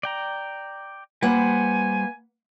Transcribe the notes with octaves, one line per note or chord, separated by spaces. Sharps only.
D5 G5 A#5
G3 A#3 B4 C5 F#5 G#5